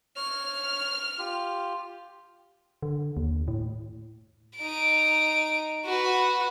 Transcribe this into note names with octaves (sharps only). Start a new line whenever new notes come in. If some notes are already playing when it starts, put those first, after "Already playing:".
C#5 F6
F4 G4
D3
D#2
A2
D#4 D7
F#4 B4